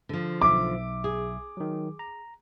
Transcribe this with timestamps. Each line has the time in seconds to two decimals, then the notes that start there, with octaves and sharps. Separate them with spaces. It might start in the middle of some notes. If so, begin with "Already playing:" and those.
0.09 D3 F3
0.42 B1 E5 D6
1.04 G#4
1.57 D#3 F#3
1.99 A#5